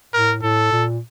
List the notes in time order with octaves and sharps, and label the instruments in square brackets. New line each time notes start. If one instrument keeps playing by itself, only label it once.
[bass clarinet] A2 [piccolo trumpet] A#4
[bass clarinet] A2 [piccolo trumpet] A4
[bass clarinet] A#2